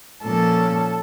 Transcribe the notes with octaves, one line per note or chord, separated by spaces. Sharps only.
A#2 F3 A#3 C#4 A4 A5